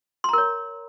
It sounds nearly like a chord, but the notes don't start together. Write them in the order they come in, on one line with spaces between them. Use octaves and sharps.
C6 A#5 A#4 C#5